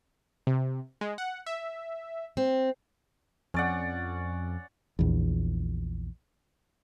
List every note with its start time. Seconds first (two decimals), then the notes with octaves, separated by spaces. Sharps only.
0.47 C3
1.01 G#3
1.18 F#5
1.46 E5
2.37 C4
3.54 F2 C#4 D5 F#5
4.99 A#1 E2